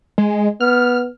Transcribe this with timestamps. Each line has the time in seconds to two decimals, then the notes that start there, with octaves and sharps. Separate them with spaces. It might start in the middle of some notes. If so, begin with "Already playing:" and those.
0.18 G#3
0.60 B3 F6